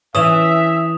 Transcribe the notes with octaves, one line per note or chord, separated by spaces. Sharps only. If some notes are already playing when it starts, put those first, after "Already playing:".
E3 C#4 E5 D#6 E7 F7